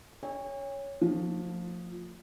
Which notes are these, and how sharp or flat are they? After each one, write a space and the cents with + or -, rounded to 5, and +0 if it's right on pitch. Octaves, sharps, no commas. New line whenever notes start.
C#5 +0 G#5 -45
F3 +15 A3 +45